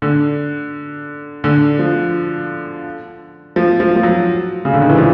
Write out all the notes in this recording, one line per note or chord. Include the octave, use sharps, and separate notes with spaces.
D3
D3
F3
F3
F3
F3
F#3
C#3
D3
D#3
E3
F3